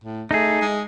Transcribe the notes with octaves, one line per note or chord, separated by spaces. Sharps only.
A2
A3 D#4 G#4
G#3